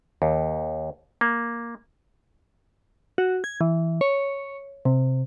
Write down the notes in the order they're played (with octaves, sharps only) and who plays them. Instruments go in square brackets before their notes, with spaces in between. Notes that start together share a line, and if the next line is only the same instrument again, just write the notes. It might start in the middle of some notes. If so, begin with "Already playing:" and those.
[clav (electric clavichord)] D#2
A#3
[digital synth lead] F#4
G#6
E3
C#5
C3